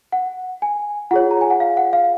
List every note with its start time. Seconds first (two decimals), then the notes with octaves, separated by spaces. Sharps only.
0.12 F#5
0.62 G#5
1.11 F4 G#4 C#5 F#5
1.31 A#5
1.41 G#5
1.50 F#5
1.60 F5
1.77 F#5
1.93 F5